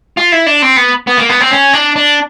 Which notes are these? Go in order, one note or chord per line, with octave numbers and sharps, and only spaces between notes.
F4
E4
D4
C4
B3
B3
A#3
B3
C4
C#4
D4
D4